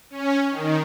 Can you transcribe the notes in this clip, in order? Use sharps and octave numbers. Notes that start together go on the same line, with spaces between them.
C#4
D#3